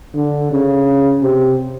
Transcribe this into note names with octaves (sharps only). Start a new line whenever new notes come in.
D3
C#3
C3